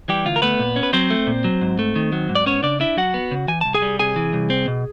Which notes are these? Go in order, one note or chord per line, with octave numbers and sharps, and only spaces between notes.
E3 G3 G4
D2 F4
A#4
A3 B3 B4
A#2
C#4
B4
F#3 C4 C5
A3
A#2
F#3
G#2
A3
D#3
F#3
G#2
D5
B3 C#4 C#5
C#3 D4 D5
D4 E4 E5
F#3 F#4 F#5
B3
C#3
E3 G#5
C2 A5
G#4 G#5
G3
C3 G#4 G#5
E3
C2
C4
B2